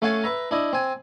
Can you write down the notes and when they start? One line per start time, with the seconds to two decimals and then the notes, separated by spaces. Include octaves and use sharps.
0.02 A3 C#4 F5 F#5 G#5 A5
0.24 B4 E5 A#5
0.51 D4 E4 D#5
0.73 C4 G#5